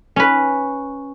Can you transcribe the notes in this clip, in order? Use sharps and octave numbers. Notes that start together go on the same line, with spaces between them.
C#4 B4